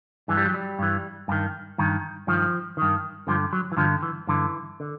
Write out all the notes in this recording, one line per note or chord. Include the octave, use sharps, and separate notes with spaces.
G2 E3 G#3
G3
F#3
G3
G2 E3
G2 D#3
G2 D#3
G2 D#3 F3
G2 D#3
G2 D3 F3
F#3
E3
G2 D3 F3
E3
G2 D3 E3
D3